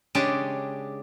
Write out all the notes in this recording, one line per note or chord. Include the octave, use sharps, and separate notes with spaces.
C#3 G#3 D4 G4 G#4